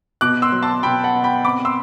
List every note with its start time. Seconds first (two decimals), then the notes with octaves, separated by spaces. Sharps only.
0.21 B2 D6 F#6
0.42 C6 E6
0.52 F#3
0.62 A5 C6
0.83 B2 G5 B5
1.04 F#5 A5
1.14 B2
1.24 G5 B5
1.45 C4 B5 D6
1.65 C6 E6